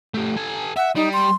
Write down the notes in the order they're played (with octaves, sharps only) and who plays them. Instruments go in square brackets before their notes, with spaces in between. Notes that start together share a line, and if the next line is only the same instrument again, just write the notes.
[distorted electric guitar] A3 G4
A4 G#5
[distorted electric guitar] E5 [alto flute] F#5
[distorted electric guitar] G3 [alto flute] D#4
[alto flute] C6